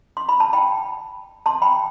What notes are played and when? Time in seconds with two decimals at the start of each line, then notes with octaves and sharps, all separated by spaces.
0.17 C6
0.29 B5
0.40 A5
0.53 G5 B5
1.46 A5 C6
1.62 G5 B5